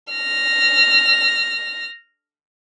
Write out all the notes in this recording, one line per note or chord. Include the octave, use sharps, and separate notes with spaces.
F6 A#6